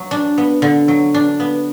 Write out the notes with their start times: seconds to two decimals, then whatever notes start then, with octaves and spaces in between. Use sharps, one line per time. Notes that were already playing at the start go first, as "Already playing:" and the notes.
Already playing: F#3
0.11 D4
0.38 B3
0.62 D3
0.88 F#3
1.14 D4
1.40 B3